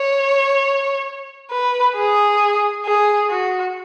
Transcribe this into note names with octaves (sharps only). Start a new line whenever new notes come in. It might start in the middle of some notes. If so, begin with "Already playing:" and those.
Already playing: C#5
B4
G#4
G#4
F#4